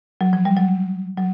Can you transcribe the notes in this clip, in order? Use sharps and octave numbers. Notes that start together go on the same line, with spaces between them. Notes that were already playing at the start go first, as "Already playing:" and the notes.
F#3
F3
G3
F#3
F#3